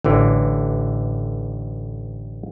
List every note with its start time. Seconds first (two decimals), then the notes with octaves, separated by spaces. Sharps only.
0.04 A1 D3 E3